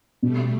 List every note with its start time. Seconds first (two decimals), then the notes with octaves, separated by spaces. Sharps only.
0.22 B2 G3 A3